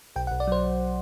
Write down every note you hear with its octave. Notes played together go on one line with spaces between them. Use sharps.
B1 G5
F#5
B1
D5
F#3 C5